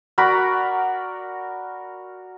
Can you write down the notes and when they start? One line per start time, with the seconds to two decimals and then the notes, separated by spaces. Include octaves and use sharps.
0.18 F#4 A#4 D5 B5